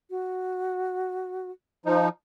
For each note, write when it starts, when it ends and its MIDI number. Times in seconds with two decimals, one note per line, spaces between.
0.10 1.50 66
1.86 2.09 53
1.86 2.09 63